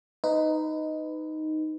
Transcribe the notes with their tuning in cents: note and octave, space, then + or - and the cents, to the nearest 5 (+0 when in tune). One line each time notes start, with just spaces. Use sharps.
D#4 +0 B4 +25